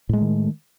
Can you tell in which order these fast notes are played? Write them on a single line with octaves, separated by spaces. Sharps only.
A2 G#3 A3 D#3